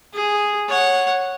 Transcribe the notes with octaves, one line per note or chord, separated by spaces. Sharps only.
G#4
C#5 F#5